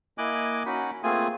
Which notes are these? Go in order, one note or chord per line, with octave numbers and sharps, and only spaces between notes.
A#3 E4 D#5 G#5 D6 F#6
C#4 D#4 F#4 B5
A3 A#3 C4 F4 G#4 G#5